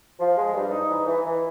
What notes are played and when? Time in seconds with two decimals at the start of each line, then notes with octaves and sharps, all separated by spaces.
0.20 F3
0.37 G#3
0.54 G2
0.72 D#4
0.89 E3
1.07 E3
1.25 E3